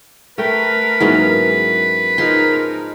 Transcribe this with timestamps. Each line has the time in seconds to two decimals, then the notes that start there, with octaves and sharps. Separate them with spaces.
0.38 A3 A#4 B4 G5
1.00 G#2 E3 F#3 A#3 B3 C#4
2.18 F3 D#4 G#4 A#4 C6